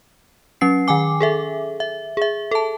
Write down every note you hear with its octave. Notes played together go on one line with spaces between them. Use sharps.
F#3 C#4 C7
D#3 G5 G#5 D6
G#4 A4 E5
E5
G#4 E5
A4 A5